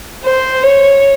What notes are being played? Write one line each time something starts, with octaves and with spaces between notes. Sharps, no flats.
C5
C#5